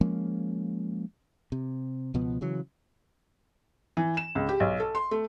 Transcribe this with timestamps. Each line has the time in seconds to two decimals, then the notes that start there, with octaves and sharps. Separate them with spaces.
0.01 F3 G#3 A#3 C#4
1.52 C3
2.14 C#2 B2 F3 B3
2.41 C#3 E3 F#3
3.97 E3
4.17 E7
4.35 C#2
4.49 G4
4.60 B1
4.80 A4
4.95 C6
5.11 A3